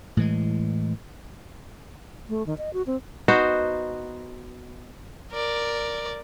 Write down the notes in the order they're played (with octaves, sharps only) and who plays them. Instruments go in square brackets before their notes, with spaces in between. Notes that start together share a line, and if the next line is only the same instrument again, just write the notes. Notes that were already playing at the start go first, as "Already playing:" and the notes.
[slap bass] A2 E3 G#3
[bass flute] A3
D#3
D#5
F#4
C4
[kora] B3 D#4 F#4 C5
[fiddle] A#4 D5